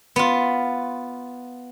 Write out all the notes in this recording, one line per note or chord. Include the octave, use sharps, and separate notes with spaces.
B3 F4